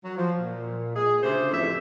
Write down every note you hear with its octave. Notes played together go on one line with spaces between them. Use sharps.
F#3
F3
A#2
G#4
D2 C#3 A3 G4 C5
F2 A2 C#3 E3 A4 E5